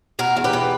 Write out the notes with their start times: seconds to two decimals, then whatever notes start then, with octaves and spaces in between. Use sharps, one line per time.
0.19 B2 F#4 A#4
0.37 E2
0.44 G4 B4
0.53 B2